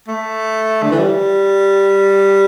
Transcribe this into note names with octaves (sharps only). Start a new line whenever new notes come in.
A3
D3
E3
G3